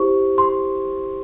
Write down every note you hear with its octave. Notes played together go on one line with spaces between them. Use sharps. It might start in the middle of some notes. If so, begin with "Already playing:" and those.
Already playing: E4 G4 C5 C#6
C6